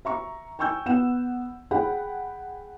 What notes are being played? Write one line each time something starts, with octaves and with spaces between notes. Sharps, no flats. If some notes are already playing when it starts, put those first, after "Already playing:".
E5 A#5 C#6
G5 G#5 C#6 E6 G6
B3 F#5 E7
G#4 F#5 G5 B5